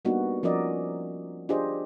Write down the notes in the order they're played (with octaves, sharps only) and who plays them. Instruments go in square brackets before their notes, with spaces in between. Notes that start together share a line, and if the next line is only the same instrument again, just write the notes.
[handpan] G3 A#3 B3 D4 D#4 F#4
F3 C#4 F#4 A#4 D5 D#5
D4 F4 G4 G#4 C5 D#5